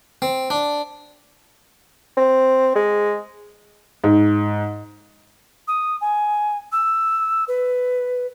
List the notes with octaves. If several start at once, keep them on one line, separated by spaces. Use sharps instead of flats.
C4
D4
C4
G#3
G#2
D#6
G#5
E6
B4